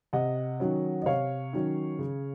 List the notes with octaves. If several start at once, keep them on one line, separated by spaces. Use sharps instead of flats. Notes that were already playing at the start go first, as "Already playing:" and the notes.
C3 D#5 F#5
D#3 F#3 C#4
D#5
C3 C#5 F5
D#3 F#3 C#4
C#3